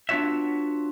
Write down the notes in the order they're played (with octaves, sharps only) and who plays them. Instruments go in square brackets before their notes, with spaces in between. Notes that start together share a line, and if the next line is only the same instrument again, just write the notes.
[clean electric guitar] B3 D4 F4 F#4 C#5 E5